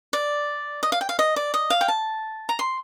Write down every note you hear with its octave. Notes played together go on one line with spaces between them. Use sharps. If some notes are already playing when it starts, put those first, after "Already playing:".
D5
D#5
F5
G5
F5
D#5
D5
D#5
F5
G5
A5
A#5
C6